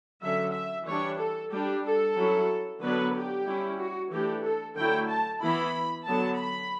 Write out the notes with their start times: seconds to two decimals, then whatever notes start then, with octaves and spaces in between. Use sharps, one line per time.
0.22 D3 F#3 C#4 E5
0.54 E5
0.87 E3 G3 D4 C#5
1.20 A4
1.52 G3 D4 G4
1.84 A4
2.17 F#3 C#4 E4
2.82 D3 F#3 B3 D4 B4
3.14 G4
3.46 G3 C#4 E4
3.79 F#4
4.11 E3 A3 D4 G4
4.44 A4
4.76 D3 F#3 A3 E4 G5
5.09 A5
5.42 E3 B3 E4 B5
6.06 D3 F#3 B3 A5
6.39 B5